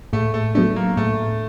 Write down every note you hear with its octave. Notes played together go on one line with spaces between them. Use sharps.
A2 A3
A3
F#3 A3 B3 D4
A#3
A2 A3